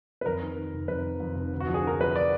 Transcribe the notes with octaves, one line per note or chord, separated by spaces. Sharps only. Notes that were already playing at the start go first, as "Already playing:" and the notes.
B4
F2 A#4
D#3
D#3
F1
F2 B4
D#3
F2
F1
D2
F#4
F3
G#4
D3 A#4
F3 B4
F3 D5